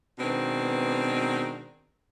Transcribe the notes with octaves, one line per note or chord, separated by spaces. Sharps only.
B2 D#3 G#3 B3 C4 D4